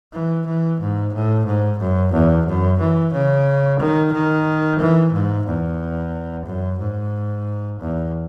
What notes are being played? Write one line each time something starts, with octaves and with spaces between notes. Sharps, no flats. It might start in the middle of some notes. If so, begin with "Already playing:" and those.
E3
E3
G#2
A2
G#2
F#2
E2
F#2
E3
C#3
D#3
D#3
E3
G#2
E2
F#2
G#2
E2